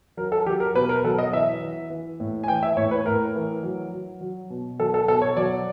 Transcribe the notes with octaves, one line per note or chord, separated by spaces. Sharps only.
F#3 A#4
A4
F#3 G4
A#4
B2 B4
A#4
F#3 A4
D#5
E3 E5
E3
E3
A2
G#5
E3 G5
E5
A2 C#5
B4
A2 A#4
E3
F#3
F#3
F#3
B2
F#3 A4
A4
B2 A4
C#5
F#3 D5